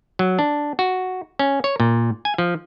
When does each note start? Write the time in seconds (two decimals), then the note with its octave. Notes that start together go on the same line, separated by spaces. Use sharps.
0.19 F#3
0.39 D4
0.79 F#4
1.39 C#4
1.64 C#5
1.80 A#2
2.25 G#5
2.38 F3